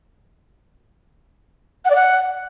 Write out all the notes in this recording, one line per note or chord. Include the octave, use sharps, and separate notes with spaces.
F#5
D5
F#5